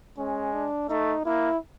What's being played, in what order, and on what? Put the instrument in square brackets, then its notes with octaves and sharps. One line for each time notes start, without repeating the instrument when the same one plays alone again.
[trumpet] G#3 [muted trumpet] C#4
[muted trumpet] D4
[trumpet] A3 [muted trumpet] D#4
[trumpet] A#3 [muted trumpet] E4